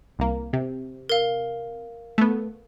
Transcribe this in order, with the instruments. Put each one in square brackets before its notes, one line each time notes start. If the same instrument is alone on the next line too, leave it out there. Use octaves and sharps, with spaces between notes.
[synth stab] C2 A#3
C3
[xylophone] A#4 F5
[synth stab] A3 B3